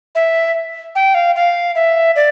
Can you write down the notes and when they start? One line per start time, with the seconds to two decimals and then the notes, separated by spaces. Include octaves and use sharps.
0.15 E5
0.95 G5
1.15 F5
1.36 F5
1.75 E5
2.16 D5